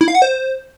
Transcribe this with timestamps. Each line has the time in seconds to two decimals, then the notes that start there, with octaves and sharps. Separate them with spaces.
0.01 E4
0.08 F5
0.15 F#5
0.22 C5